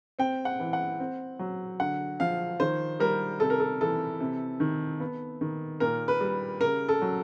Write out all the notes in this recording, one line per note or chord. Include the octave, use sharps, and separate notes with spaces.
C4 G5
F#5
E3
F#5
C4
F#3
D3 F#5
F3 F5
D#3 C5
G3 A#4
C3 A4
A#4
A4
E3 A4
C3
D#3
B3
D#3
A#2 A#4
B4
G3
C#3 A#4
A4
F#3